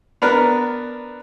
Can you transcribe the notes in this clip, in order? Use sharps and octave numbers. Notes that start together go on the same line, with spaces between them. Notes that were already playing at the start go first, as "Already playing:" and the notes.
B3 D4 A#4 B4